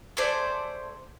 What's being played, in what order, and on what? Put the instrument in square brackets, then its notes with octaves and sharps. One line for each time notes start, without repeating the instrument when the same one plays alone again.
[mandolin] A3 G#4 C5 D5